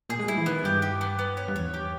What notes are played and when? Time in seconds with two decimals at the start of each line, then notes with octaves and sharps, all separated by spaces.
0.10 A#2 G#4
0.20 G#3
0.28 G3 E4
0.38 E3
0.46 D#3 B3
0.64 G2 G4
0.82 G4
1.01 B3
1.19 B3
1.37 C#5
1.48 G2
1.55 E2 C#5
1.74 G4